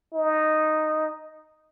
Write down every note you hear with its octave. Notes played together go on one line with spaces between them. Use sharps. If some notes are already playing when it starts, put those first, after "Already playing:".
D#4